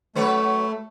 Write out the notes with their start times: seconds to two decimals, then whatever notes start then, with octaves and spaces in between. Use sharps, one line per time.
0.15 F#3 A3 B4 C#5